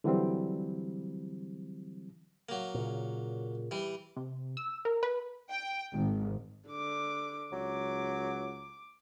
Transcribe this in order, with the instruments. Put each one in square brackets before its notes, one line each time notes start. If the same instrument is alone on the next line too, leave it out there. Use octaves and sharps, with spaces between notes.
[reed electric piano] D3 E3 F#3 G3 C4
[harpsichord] F#3 A#3
[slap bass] A#2 C#3
[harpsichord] E3 G3
[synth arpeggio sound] C3
E6
A#4
B4
[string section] G5
G#1
[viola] D3 D6
[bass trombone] C#2 [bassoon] F#3 [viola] D6